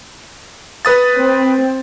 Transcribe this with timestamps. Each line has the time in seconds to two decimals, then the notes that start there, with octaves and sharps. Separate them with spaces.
0.85 B4 D#6 A6
1.17 C4